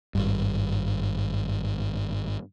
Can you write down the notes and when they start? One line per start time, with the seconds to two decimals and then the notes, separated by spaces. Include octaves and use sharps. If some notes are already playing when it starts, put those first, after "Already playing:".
0.15 G#1 G2